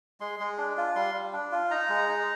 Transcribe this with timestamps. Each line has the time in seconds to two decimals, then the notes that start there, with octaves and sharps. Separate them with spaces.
0.21 G#3 C6
0.40 G#3
0.58 D4
0.77 F4
0.96 G3 C6
1.14 G3
1.33 D4
1.52 F4
1.71 D#4 A#5
1.89 G#3
2.09 D#4